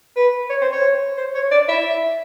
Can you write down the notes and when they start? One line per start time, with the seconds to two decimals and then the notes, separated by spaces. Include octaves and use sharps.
0.16 B4
0.50 C#5
0.62 C5
0.73 C#5
1.18 C5
1.35 C#5
1.51 D5
1.69 E5